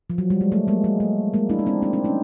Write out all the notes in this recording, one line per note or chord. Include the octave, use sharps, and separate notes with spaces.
F3
F#3
G3
G#3
A3
G#3 A#3
G#3
A3
G#3 A#3
D4 E4
D#4
C4 D4
C4 D4
C4 D4
C#4 D#4